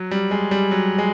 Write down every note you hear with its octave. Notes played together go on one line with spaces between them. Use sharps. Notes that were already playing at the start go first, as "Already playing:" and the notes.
Already playing: F#3
G3
G#3
G3
F#3
G#3